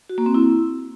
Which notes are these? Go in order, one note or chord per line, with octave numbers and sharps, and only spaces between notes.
F#4
A#3
C4
E4